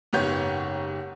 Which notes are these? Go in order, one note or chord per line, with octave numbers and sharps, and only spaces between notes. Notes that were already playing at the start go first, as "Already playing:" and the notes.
F#1 G#2 B3 G4 C#5 G6